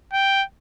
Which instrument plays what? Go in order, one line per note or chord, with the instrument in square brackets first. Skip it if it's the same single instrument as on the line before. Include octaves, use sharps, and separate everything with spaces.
[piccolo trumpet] G5